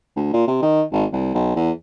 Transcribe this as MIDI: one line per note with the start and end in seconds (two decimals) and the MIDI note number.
0.16 0.32 38
0.33 0.45 46
0.47 0.59 48
0.62 0.83 51
0.92 1.05 32
1.12 1.34 36
1.34 1.52 35
1.56 1.71 40